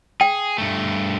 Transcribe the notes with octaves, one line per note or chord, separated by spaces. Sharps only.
G#4 G5
G2 A3